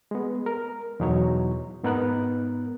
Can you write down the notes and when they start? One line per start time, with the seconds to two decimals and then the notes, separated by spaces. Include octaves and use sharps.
0.11 G#3 B3
0.46 A#4
1.00 E2 B2 F#3 D#4 C#5
1.83 G#2 B3 D#4 A#4 F#6